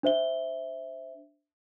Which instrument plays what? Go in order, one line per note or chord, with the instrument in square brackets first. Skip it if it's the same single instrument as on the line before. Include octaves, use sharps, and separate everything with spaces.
[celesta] D4 C5 E5 G7